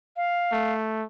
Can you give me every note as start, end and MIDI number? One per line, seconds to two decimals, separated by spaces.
0.16 0.73 77
0.52 1.04 57